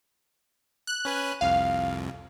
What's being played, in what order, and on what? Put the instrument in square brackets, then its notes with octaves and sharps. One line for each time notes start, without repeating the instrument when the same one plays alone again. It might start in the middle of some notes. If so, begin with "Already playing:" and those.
[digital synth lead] F#6
[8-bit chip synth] C#4 B4 G#5
[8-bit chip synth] C2 F2 [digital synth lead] F5